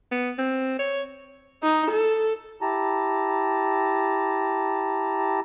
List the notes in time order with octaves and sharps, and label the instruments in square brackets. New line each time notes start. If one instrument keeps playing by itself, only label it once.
[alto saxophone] B3
C4
C#5
[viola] D#4
A4
[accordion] E4 G4 A5 A#5